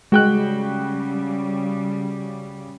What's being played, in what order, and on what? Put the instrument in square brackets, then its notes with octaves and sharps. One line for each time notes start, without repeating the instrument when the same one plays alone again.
[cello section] C#3 G3 [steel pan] G#3 [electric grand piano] F#4 G5 F#6